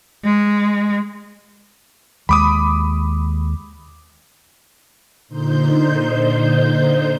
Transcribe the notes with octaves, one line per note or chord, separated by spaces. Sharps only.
G#3
D#2 G#3 B5 D6 D#6
A#2 D3 D#4 C5 G6